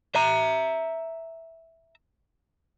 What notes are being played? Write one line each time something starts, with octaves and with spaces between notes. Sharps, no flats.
E5 A#5